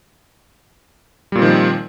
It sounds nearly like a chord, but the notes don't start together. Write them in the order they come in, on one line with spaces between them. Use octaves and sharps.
G3 A#2 C4 D#3 F3